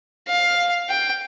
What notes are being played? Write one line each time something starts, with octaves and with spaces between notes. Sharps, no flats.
F5
G5